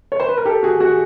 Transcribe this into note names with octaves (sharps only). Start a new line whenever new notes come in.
C#5
C5
B4
A#4
G4 A4
F#4 G#4
F#4 G#4